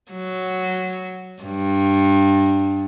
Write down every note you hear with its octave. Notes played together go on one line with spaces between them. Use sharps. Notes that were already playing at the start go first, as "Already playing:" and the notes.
F#3
G2